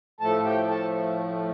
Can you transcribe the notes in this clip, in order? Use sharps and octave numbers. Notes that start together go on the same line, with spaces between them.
A2 F3 A3 A4 A5
G4 G5
A4 A5